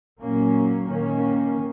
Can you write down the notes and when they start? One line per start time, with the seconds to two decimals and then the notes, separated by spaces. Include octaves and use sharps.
0.21 A#2 F#3 A#3 C#4
0.89 D#3 A#3 C#4